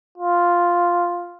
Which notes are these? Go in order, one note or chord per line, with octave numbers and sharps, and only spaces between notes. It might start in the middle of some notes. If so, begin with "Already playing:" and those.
F4